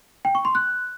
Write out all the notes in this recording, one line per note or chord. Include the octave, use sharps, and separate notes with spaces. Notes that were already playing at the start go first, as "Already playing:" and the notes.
G5
C#6
C6
F#6